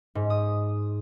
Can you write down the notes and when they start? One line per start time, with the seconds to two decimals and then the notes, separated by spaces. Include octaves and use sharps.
0.15 G#2
0.30 D#6